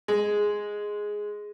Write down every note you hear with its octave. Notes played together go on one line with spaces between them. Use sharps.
G#3